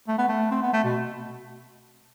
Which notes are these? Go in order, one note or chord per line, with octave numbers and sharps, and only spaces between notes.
A3
B3
A3
C4
B3
A3
B2